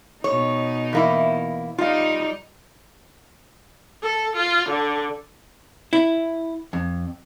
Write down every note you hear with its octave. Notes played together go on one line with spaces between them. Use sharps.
B2 D#4 C#5
E2 A#3 E4
G3 D#4 F4 D5 F5
A4
F4
D3
E4
F2